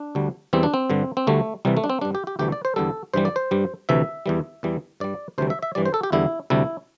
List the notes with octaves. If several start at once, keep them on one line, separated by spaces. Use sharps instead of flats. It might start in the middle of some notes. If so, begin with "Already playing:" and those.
Already playing: D4
D2 D3 G3
E2 E3 G3 C4
D4
C4
G2 D3 G3
C4
D2 D3 G3 A3
C2 C3 E3 G3
A3
D4
C4
G2 G3 D4
G4
G4
D2 C3 E3 G3 G4
D5
C5
E2 D3 G3 A4
G2 E3 G3 C5
D5
C5
G2 G3
D2 C3 E3 E5
E2 E3 G3
E2 E3 G3
G2 G3 D5
D2 C3 E3 G3 C5
E5
E5
G2 E3 G3 D5
C5
A4
G4
E2 D3 G3 E4
D2 C3 G3 E4